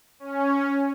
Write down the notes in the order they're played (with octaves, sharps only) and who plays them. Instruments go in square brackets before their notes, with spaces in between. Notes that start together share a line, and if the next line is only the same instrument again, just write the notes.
[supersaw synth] C#4